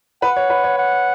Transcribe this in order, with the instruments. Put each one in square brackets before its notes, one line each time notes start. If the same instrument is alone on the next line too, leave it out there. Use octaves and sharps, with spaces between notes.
[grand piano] B4 [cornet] F#5
[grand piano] C#5
B4
C#5
[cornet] F#5